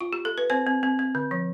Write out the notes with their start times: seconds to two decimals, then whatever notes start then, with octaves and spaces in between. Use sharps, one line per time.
0.01 F4
0.13 G4
0.25 A4
0.38 B4
0.50 C4 C5
0.67 C4
0.83 C4
0.99 C4
1.15 D3
1.31 F3